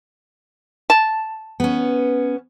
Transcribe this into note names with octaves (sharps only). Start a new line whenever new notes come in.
A5
B3 C#4